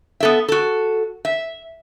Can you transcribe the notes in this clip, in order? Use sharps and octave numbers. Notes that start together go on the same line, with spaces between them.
B3 A4 E5
F#4 A4
E5